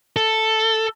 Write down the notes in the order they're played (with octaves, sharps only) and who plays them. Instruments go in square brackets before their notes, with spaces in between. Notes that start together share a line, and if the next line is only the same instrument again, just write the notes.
[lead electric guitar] A4